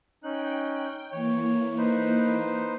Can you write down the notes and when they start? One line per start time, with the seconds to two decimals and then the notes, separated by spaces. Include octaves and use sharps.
0.24 C#4 D#4 G5 F#6
1.11 E3 A#3 C#5
1.78 D#4 B4 C5